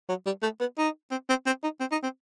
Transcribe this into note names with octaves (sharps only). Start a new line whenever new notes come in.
F#3
G3
A3
B3
D#4
C4
C4
C4
D#4
C4
D#4
C4